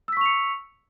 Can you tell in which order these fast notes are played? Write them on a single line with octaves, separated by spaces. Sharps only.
E6 B6 C#6 F7 C#7